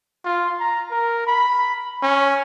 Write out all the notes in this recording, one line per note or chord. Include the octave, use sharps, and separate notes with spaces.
F4
A#5
A#4
B5
C#4